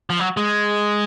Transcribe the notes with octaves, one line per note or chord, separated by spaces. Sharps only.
F3
F#3
G#3